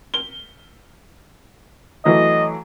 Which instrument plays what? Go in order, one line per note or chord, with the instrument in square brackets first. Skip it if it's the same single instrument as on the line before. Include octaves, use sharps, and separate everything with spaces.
[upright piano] G7
[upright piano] E3 F#3 A3 [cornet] D#5